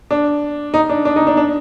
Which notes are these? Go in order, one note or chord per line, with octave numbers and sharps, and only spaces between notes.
D4
D#4
D4
D4
D#4
D4
D4